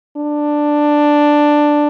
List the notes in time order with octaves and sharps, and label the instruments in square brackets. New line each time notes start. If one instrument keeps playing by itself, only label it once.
[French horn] D4